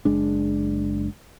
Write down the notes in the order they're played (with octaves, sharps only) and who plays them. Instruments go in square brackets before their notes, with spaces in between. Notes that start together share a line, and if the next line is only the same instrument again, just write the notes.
[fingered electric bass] F#1 G#3 D4